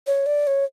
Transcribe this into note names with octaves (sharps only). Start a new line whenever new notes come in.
C#5
D5
C#5